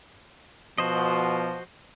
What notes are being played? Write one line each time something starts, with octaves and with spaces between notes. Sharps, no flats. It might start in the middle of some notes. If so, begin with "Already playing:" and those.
B2 F3 F#4 C5 D#5